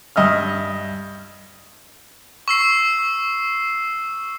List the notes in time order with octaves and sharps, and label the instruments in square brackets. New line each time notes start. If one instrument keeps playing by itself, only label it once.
[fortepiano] G2 D#5 E5 F6
[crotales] C#6 E6 C7